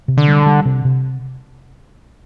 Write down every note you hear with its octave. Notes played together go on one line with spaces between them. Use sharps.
C3
D3
G3
G3
C3
C3